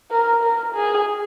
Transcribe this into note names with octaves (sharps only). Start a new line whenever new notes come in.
A#4
A#4
G#4